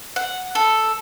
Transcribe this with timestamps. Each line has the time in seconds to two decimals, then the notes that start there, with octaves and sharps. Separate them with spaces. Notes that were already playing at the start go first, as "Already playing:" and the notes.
0.16 F#5
0.55 A4